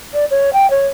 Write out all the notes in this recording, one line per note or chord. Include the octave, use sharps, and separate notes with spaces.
D5
C#5
G5
C#5